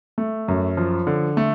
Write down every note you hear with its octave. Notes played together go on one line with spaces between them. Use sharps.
A3
F#2
F3
D3
A3